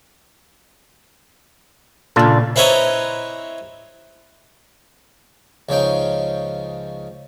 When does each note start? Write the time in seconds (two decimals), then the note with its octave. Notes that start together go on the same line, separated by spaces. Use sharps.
2.16 A#2 C#3 D4 F4 A4
2.56 C4 E4 B4 C#5 D#5 A#5
5.69 C#2 C#3 F3 C#4 D#4 G5